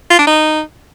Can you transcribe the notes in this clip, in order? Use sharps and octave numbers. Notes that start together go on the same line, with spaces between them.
F4
D4
D#4